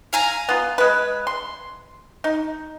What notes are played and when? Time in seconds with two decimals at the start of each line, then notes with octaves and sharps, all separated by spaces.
0.13 F5 G#5 A#5
0.49 B3 F4
0.78 G#3 B4
1.27 C6
2.24 D#4